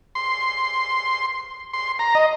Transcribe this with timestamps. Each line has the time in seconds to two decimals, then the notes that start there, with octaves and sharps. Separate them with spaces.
0.15 C6
1.73 C6
1.99 A#5
2.15 D#5